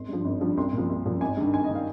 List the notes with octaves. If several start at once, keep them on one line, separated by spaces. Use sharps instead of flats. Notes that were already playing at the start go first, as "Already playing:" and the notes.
Already playing: G#1 C6
G2 F3
G#1
G2 F3
C2 C6
A#2 F3
C2
A#2 F3
G#1 G#5
G2 D#3
G#1 G#5
D#5
D#3
F5